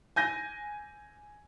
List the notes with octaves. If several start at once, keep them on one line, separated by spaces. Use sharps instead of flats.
G#5 G6 A#6 D#7